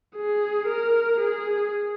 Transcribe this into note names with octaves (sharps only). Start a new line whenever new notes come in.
G#4
A#4
G#4